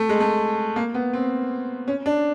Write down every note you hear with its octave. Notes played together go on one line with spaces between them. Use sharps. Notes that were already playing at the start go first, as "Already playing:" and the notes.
Already playing: A3
G#3
A3
A#3
B3
C4
C#4
D4